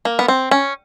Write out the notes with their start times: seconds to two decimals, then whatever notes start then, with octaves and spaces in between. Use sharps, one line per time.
0.05 A#3
0.19 B3
0.28 C4
0.51 C#4